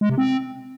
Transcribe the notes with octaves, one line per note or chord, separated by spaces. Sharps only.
G#3
C3
C4